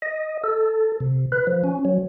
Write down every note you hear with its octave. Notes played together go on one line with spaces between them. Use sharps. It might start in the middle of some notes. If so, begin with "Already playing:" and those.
D#5
A4
C3
B4
F3
C#4
F#3